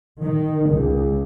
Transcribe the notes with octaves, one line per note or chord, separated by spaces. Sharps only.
D#3
C#2